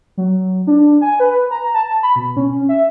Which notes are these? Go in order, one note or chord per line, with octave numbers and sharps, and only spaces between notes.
F#3
D4
G#5
B4
A#5
A5
B5
B2
C#4
E5